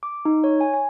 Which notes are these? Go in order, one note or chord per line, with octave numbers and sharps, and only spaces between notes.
D6
D#4
C#5
G#5
G#5